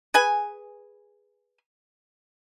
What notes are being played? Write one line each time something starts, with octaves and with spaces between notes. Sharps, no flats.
G#4 B4 G#5